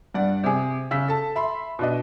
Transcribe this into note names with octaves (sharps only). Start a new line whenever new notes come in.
G2 D5 F#5
C3 G#4
C#3 E6 B6
A4 A5
E5 B5 C6
B2 D4 D#5